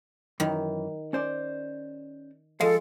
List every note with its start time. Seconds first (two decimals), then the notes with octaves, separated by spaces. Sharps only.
0.40 F#2 D#3 E3
1.13 C#4 C5 D5
2.61 F3 G#3 A4 F5